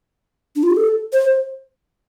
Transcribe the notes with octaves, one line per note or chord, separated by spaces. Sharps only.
D4
F4
G4
A4
C5